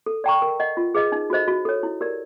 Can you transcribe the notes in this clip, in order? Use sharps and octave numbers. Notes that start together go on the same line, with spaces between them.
A4
D5 G5 A#5 C#6
A#4
D#5 F#5
F4
G#4 B4 D#5
D#4
F#4 A4 C5 D#5
F#4
A4 C#5
E4
G4 A#4 D5